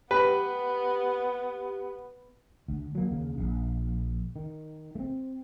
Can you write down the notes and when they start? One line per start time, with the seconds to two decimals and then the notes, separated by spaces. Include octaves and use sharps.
0.11 B3 G4 B4
2.68 D2
2.95 F#3 A#3
3.11 D#2 C#3
3.38 A#1
4.36 D#3
4.95 A3 C4